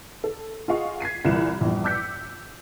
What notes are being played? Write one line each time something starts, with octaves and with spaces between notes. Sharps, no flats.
A4
F4 G#4 D#5 F5 F#5 C#6
G#6 B6 C7 D#7
C2 A#2 E3 E4 E7
A#1 E2 G2
D6 E6 G6 B6 C#7